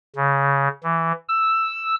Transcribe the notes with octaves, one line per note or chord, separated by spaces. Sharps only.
C#3
E3
E6